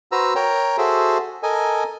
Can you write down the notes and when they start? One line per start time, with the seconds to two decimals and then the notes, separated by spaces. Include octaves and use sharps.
0.12 F#4 B4 C5 A#5 E6
0.35 A#4 C#5 G5 A#5
0.78 F#4 G#4 A4 C5 E5
1.43 A4 A#4 D#5 G#5